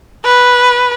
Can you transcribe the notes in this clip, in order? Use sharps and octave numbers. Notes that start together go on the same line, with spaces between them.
B4